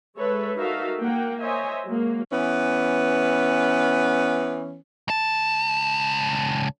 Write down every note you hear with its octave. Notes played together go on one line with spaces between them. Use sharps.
G#3 A4 B4 C#5 E5
D#4 F#4 A4 A#4 E5 F5
A#3 F#5 G5
C5 C#5 D#5 E5 G#5
F#3 G#3 A#3
E3 B3 C#4
C#2 A5